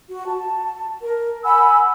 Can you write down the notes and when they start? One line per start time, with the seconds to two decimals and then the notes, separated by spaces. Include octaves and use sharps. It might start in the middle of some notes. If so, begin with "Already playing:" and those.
0.09 F#4
0.26 A5
1.01 A#4
1.44 F#5 G#5 B5 E6